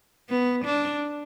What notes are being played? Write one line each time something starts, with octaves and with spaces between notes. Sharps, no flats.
B3
D4